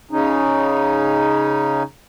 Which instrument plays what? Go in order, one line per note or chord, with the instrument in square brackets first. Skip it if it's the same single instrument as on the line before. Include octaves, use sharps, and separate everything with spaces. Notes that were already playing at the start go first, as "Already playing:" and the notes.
[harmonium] C#3 C#4 D#4